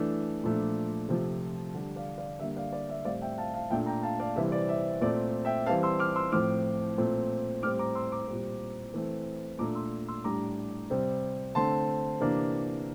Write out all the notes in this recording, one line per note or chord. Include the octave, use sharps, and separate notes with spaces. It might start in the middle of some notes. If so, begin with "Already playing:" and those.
Already playing: E3 A3 D4
A#2 F3 A3 D4
C3 F3 A3
D3 G3 D4
D5 F5
D5 F5
D3 G3 A#3 E5
D5 F5
D5
E5
A2 G3 C4 D5 F5
E5 G5
F5 A5
F5 A5
A#2 A3 D4 E5 G5
G5 A#5
F5 A5
D5 F5
C3 E3 G3 C4 E5
D5
E5
A#2 A3 C4 D5
E5 G5
E3 G3 C4 F5 A5
C6 E6
D6 F6
C6 E6
A2 F3 C4 D6 F6
A#2 A3 C4
A2 G3 C4 D6 F6
A#5 D6
C6 E6
A#5 D6
A#2 G3 C4
E3 A3 C4
A#2 A3 D4 A#5 D6
C6 E6
C6 E6
A2 G3 D4 A#5 D6
C3 G3 C4
D3 A3 C4 A5 C6
C3 E3 A#3 D4